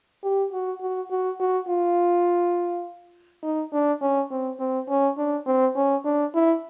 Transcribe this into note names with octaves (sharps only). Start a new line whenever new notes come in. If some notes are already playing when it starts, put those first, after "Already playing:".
G4
F#4
F#4
F#4
F#4
F4
D#4
D4
C#4
C4
C4
C#4
D4
C4
C#4
D4
E4